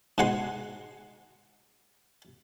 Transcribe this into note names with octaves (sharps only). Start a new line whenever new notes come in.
G#2 B2 F#5 G#5 C6